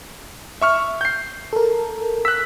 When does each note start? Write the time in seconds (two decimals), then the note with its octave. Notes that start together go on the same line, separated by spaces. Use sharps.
0.61 E5 C#6 F6
1.01 G6 C7
1.53 A4 A#4
2.25 E6 F#6 B6